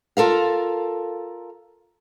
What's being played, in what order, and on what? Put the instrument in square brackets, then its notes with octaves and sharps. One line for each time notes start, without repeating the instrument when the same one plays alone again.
[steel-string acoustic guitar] F4 A4 A#4 F5